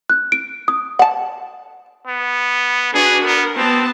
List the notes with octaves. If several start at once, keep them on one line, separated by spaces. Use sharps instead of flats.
F#6
D7
D#6
F#5 A5
B3
D4 F#4 G#4 B4
B3 A#4
B3 C4 A5